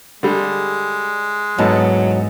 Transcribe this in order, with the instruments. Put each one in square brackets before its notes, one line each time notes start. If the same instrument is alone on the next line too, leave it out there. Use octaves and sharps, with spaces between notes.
[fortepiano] D3 G3 [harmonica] G#3
[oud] E2 G#2 [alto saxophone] F#3 [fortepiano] B3 D#4 A4